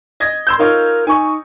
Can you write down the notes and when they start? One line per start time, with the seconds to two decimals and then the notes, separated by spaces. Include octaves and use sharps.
0.20 D#5 G#6 A#6
0.47 C6 E6 G6
0.59 D#4 F4 A#4 C#5
1.07 D#4 G#5 C#6